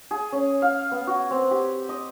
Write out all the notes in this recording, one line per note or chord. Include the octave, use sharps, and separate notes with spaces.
G#4
C#4
F5
B3
F#4
C4
G4
D#5